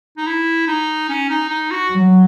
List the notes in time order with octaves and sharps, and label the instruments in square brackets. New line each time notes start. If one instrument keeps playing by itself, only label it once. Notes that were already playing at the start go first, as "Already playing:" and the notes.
[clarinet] D#4
E4
D#4
C#4
D#4
D#4
F#4
[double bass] F#3